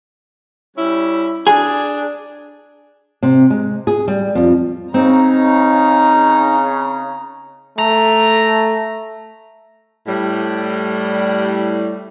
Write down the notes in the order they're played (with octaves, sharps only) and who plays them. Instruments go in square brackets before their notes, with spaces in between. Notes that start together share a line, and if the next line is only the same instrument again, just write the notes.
[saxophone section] G3 C#4 E4
[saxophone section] D4 [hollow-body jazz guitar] G#4
[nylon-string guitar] C3
G#3
G#4
G3
F2
[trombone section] C#3 [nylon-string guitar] C4 [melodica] D#4 [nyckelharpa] A#5
[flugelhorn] A3 [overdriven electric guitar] A#5
[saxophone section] A2 G3